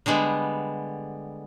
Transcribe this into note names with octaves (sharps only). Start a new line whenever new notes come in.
D3 G3 G#3 B3